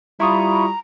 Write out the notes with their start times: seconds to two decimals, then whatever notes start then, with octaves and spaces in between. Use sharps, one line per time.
0.20 G3 E4 F4 A#5 B5 C#6 D#6